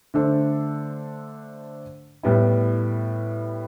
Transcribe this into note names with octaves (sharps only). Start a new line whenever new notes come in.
D3 A3 D4 A4 C5
A2 G3 B3 E4